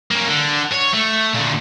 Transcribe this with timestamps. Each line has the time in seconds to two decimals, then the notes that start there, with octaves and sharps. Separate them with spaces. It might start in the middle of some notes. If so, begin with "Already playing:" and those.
0.11 A#3 C#4
0.28 D3
0.72 C#5
0.94 A3
1.35 A#2 D3